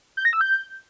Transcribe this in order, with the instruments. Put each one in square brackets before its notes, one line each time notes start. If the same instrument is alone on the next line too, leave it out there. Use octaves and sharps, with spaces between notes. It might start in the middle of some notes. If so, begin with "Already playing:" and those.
[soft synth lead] G6
A#6
E6
G6